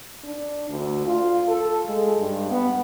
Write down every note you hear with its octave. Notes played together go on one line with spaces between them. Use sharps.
D4
D2
F4
A4
G#3
G2
B3